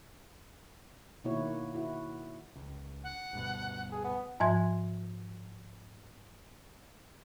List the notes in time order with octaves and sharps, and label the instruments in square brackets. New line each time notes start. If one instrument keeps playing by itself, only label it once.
[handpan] B2 D#3 A#3 E4 F#4 C#5
E4 F#4
[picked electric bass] C#2
[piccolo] F#5
[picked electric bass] D2 G2 B2
[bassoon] G#4
B3
[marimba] G#2 F3 E5 G#5 C6 G#6